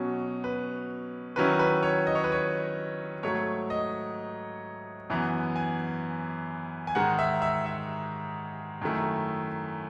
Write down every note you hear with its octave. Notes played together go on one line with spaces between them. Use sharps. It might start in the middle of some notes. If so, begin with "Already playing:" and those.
Already playing: B2 F#3 C#4
B4
D#3 F#3 C#4 E4 B4
B4
C#5
D#5
C#5
B4
C#5
G#2 F#3 A3 C#5
D#5
F#2 E3 B3
G#5
G#5
G#2 D#3 G#3 F#5
E5
E5
E5
F#2 D#3 A3 E4